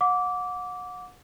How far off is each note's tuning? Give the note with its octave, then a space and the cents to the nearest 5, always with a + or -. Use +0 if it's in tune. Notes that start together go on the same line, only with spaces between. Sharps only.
F#5 -30 D6 -15